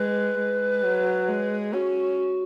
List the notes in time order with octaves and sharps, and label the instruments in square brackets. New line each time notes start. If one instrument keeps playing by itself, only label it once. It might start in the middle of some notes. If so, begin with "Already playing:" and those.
Already playing: [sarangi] G#3 [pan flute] B4
[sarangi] G#3
F#3
G#3
[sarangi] C#4 [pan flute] F#4